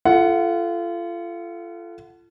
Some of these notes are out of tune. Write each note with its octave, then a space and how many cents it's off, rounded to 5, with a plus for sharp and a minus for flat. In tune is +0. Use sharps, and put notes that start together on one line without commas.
F4 -30 A4 -10 F#5 +0